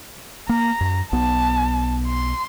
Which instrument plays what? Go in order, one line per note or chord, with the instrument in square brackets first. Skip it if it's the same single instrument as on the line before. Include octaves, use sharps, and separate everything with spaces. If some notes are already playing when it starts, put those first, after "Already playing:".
[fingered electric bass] A#3 [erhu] A#5
[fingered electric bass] F#2
[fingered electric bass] B1 B3 [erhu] A5
[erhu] C6